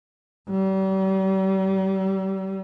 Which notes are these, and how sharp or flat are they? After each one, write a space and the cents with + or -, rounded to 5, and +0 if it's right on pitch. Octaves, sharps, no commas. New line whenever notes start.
G3 -40